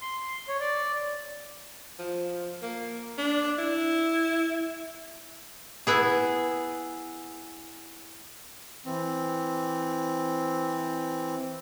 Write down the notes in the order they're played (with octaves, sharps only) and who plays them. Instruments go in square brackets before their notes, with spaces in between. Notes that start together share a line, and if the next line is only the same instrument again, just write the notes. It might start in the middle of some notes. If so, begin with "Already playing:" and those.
[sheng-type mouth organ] C6
C#5
D5
[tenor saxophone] F3
A#3
D4
E4
[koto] B3 E4 G#4
[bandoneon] E3 C4